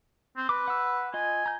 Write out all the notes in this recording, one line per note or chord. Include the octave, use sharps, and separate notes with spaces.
C4
B4 D6
F#5 E6
F4 D#5 G#5
A#5 G6